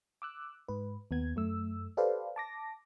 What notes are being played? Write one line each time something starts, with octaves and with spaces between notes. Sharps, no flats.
D6 E6 F#6
G#2 B4
D#2 B3 G#6
F#2 A3 E6
G4 A4 B4 C5 D5 F5
A5 D6 A#6